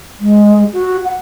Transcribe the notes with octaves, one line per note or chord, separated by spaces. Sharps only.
G#3
F#4
F#5